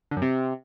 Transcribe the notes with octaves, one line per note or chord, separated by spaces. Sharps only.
D3
F#2
C3